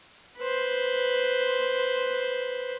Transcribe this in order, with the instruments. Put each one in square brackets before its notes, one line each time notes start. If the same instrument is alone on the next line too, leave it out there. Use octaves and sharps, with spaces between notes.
[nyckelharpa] B4 C5